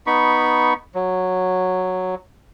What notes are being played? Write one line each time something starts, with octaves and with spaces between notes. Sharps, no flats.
B3 D#4 B5 C#6
F#3